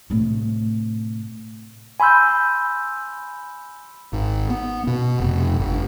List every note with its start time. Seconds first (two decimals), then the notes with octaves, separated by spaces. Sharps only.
0.10 A2 C3
2.00 G#5 B5 C6 E6 G6
4.13 G#1
4.50 B3
4.87 B2
5.20 F1
5.60 G1